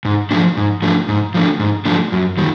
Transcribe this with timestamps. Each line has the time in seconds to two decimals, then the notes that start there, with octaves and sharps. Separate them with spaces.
0.05 G#2
0.31 F3 A3 D4
0.57 G#2
0.82 F3 A3 D4
1.09 G#2
1.34 F3 A3 D4
1.60 G#2
1.85 F3 A3 D4
2.12 F#2
2.37 D#3 G3